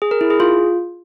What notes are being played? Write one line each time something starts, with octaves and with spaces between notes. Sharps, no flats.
G#4
A#4
E4
G#4
F4